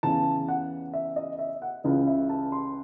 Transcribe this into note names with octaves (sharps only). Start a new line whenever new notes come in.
E2 C#3 E3 A5
F#5
E5
D#5
E5
F#5
C#2 C#3 E3 D#5
E5
A5
C6